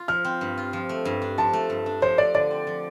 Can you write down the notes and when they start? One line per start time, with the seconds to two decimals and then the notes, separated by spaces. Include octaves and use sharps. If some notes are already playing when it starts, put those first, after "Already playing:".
Already playing: F4
0.08 F3 F6
0.24 C4
0.41 G2
0.58 F4
0.73 F3
0.89 A3
1.05 G2
1.22 D4
1.38 F3 A5
1.53 A3
1.70 G2
1.86 D4
2.02 F3 C5
2.18 A3 D5
2.34 D3 D5
2.51 C4
2.67 F3